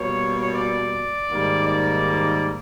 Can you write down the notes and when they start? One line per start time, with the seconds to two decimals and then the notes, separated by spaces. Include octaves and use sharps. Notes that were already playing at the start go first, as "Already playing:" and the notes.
Already playing: B2 G3 A#3 C#5
0.53 D5
1.30 G#2 D#3 G3 A#3
1.68 D5